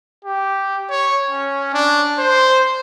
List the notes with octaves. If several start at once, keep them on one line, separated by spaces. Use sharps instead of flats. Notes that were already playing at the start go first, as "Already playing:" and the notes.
G4
C#5
C#4
D4
C5